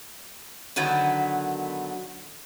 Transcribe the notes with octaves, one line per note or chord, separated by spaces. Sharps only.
D3 D#3 F#3 B3